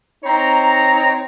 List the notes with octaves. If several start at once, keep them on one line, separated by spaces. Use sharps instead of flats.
C4 D#4 C#5 A#5